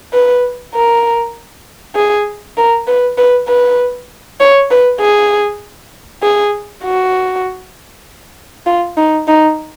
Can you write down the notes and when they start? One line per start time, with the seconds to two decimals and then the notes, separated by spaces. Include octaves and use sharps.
0.13 B4
0.75 A#4
1.95 G#4
2.57 A#4
2.87 B4
3.18 B4
3.48 B4
4.40 C#5
4.71 B4
5.00 G#4
6.22 G#4
6.84 F#4
8.66 F4
8.97 D#4
9.27 D#4